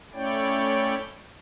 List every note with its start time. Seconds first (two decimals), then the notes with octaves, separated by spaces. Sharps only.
0.13 A3 C#4 E4 C#5 D5 G5